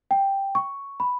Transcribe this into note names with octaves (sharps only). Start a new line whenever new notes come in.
G5
C#6
B5